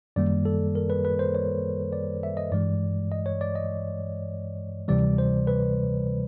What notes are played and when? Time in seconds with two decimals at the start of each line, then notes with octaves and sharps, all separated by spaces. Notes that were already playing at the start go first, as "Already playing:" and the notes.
0.16 F#2 D#3 G3 A#3 D5
0.45 A4
0.75 A#4
0.90 B4
1.05 B4
1.19 C5
1.35 C#5
1.93 D5
2.23 E5
2.37 D#5
2.52 G2 E3 G#3 D5
3.12 D#5
3.26 C#5
3.41 D5
3.55 D#5
4.88 D2 C3 E3 G3 D5
5.18 C5
5.47 B4